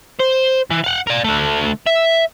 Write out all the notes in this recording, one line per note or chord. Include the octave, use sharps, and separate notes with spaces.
C5
E3
F5 F#5
A#4 D5
D3 A3
E5